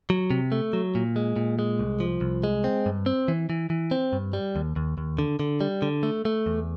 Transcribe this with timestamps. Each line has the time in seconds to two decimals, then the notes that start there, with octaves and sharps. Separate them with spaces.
0.10 F#3
0.31 C3
0.52 A3
0.73 F#3
0.95 A#2
1.16 G#3
1.36 A#2
1.59 G#3
1.79 C2
2.00 F3
2.21 C2
2.44 G#3
2.64 C4
2.86 G2
3.06 C4
3.28 E3
3.50 E3
3.70 E3
3.91 C4
4.13 G2
4.33 G3
4.56 D#2
4.76 D#2
4.98 D#2
5.19 D3
5.40 D3
5.61 G3
5.82 D3
6.03 A3
6.25 A3
6.46 E2